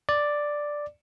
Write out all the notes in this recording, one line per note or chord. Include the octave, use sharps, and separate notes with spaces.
D5